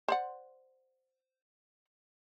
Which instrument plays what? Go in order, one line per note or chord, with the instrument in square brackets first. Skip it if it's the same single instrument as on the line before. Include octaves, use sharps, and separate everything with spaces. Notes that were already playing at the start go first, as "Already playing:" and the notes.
[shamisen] C5 D5 F#5